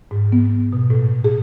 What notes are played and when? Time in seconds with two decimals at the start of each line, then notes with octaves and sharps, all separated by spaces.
0.11 G#2
0.32 B3
0.73 B2
0.90 A2
1.24 G#4